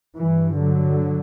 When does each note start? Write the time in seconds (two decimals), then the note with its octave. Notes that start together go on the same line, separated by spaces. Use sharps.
0.20 G2 E3
0.58 D3 F#3